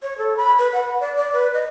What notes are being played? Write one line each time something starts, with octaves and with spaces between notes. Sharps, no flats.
C#5
A4
B5
B4
F#5
D5
D5
B4
D#5